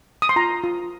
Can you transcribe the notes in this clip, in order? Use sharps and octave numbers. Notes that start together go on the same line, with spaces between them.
D#6
C6
F4 A#5
F4